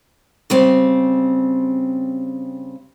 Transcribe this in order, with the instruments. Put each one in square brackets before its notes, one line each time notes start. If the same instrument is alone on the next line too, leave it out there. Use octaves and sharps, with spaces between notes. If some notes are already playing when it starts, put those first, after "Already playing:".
[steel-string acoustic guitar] C#3 G3 C4